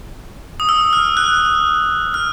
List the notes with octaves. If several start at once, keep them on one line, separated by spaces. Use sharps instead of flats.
D#6
E6
F6
F#6
F6